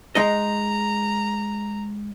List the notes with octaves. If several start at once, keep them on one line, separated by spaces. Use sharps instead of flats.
G#3 D#4 D#5 A#5